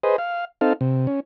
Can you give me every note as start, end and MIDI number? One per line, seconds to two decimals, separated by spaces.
0.04 0.16 68
0.04 0.16 71
0.04 0.16 72
0.04 0.16 75
0.18 0.45 77
0.61 0.73 60
0.61 0.73 63
0.61 0.73 69
0.61 0.73 77
0.81 1.07 48
1.07 1.20 61